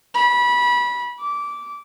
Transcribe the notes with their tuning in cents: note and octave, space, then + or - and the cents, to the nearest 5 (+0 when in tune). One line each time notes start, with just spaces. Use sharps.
B5 -25
D6 -15